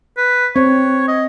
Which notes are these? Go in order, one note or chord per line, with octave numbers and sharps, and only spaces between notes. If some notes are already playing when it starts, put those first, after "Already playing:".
B4
C4 C#5
D#5